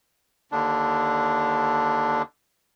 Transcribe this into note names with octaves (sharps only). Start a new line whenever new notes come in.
D#2 D3 D4